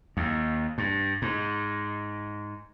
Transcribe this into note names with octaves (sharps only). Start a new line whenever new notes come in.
D#2
G2
G#2